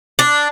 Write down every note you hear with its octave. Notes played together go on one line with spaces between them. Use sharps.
D4